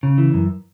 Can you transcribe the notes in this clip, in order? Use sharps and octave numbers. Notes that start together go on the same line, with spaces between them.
C#3
E3
F#2